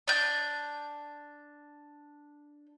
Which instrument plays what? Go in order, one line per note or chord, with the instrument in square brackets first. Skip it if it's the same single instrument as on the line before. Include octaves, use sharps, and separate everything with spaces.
[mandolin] D4 G6